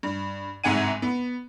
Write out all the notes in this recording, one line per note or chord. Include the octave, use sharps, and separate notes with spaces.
G2
G1 G#2 C3 F#5 G#5 D#7
B3